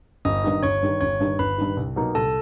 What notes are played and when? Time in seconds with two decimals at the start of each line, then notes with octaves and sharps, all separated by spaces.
0.25 G1 D#5 D#6
0.44 G2 D#3
0.63 G1 C#5 C#6
0.82 G2 D#3
1.01 G1 C#5 C#6
1.20 G2 D#3
1.39 G1 B4 B5
1.58 G2 D#3
1.77 C2
1.96 B2 F#3 A#3 D#4
2.15 C2 A4 A5